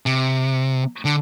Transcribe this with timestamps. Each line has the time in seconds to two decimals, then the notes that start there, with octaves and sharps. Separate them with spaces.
0.06 C3
1.05 D3